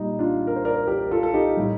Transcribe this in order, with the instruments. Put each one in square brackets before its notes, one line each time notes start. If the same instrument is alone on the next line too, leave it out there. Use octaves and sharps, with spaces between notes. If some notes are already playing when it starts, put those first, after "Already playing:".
Already playing: [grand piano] A#2 G3 D#4
D4 F4
A#4
C5
A#4 D5
G4 A#4
F4 A4
A4
D#4 G4
A2 G3